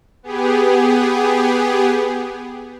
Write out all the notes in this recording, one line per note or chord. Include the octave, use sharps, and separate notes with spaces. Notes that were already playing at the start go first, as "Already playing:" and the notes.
B3 G4 G#4